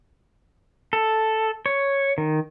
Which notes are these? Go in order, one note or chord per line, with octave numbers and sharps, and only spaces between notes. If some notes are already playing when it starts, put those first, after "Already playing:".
A4
C#5
D#3